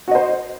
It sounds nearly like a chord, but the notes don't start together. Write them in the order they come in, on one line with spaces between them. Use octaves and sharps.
F#4 D#5 C5